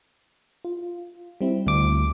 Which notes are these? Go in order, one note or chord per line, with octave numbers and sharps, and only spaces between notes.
F4
G3 C4 E4
D2 D6